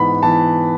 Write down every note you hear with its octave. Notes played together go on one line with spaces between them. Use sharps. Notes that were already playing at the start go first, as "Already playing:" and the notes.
Already playing: G#2 E3 B3 B5
E3 B3 A5